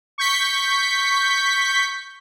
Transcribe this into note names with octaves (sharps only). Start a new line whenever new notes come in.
C#6 G6 B6